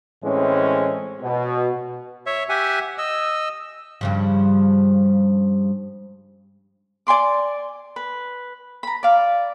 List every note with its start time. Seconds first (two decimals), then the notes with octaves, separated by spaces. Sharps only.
0.24 A2 E3 G#3 C4 C#4
1.22 B2
2.26 C#5 E5
2.49 G4 E5 F#5 G#5
2.98 D#5 E6
4.01 G2 C#3 F3
7.07 D5 G#5 C6 D6
7.96 B4
8.83 A#5 B5
9.03 D5 F5